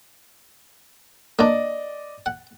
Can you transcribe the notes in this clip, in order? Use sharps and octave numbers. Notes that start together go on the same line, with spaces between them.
A#3 D4 D5 D#5
F#5